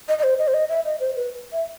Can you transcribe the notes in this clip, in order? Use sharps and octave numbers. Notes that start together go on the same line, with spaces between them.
D#5
D#5
C5
D#5
C5
D#5
E5
D#5
C5
B4
E5